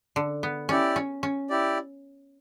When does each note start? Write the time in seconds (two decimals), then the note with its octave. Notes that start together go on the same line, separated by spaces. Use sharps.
0.16 D3
0.43 B3
0.69 C#4 E4 G4 D5
0.96 C#4
1.23 C#4
1.50 E4 G4 D5